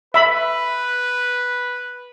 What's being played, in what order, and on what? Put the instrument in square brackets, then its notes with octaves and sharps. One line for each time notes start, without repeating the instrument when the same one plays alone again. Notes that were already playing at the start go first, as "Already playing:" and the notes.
[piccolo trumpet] B4 [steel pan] E5 B5